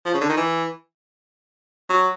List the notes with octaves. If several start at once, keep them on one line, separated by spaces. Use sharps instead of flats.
F3
C#3
D3
D#3
E3
F#3